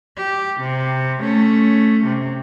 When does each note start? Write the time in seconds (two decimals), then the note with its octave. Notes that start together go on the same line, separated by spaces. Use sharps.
0.17 G4
0.61 C3
1.20 A3 C#4
2.06 C3